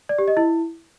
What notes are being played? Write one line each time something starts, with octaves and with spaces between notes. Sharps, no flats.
D5
G4
D#5
E4